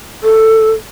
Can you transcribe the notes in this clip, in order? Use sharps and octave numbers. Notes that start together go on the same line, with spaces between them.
A4